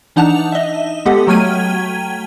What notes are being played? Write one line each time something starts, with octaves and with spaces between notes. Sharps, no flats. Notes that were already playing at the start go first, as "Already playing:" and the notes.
E3 D4 D#4 F#5 A5 F7
D#5 E5
G#3 B3 G4 A4 D#5 F#5
F#3 A3 G5 F6 G#6 D#7